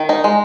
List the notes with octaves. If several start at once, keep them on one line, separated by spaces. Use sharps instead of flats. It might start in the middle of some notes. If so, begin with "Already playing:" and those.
Already playing: D#3
D#4
G#3